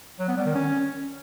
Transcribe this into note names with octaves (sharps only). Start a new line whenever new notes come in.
F#3
B3
G3
D#3
C#4